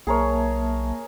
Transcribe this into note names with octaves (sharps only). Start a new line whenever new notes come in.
B1 A#3 G#4 A#4 C#5 E5 A5